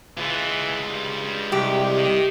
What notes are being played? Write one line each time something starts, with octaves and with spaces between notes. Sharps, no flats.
E3 G#3 F4
G2
C2 G4
D#3